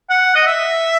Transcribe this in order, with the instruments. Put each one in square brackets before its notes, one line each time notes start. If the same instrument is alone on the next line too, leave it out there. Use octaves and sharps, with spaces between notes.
[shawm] F#5
D#5
E5